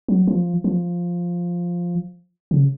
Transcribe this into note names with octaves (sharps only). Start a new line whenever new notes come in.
F#3
F3
F3
C#3